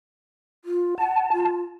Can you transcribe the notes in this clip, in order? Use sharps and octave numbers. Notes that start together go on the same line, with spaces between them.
F4
F#5 A5
F4